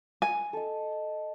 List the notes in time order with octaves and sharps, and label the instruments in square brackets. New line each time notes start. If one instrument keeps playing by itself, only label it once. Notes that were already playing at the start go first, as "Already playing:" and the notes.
[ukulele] G#5
[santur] A4 D#5